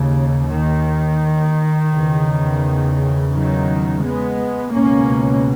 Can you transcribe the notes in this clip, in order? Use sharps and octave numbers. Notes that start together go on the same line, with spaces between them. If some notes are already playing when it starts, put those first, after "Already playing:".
Already playing: D#2 C#3
D#3
E2 C#3
D#3 F#3
G#3 B3
C#2 B2 A#3 C#4